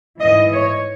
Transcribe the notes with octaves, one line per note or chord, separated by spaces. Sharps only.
G#2 E3 D#5
C#5